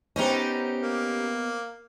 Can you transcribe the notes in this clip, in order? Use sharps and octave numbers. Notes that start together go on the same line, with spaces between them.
B3 C#4 D#4 G4 C5 D#5
A#3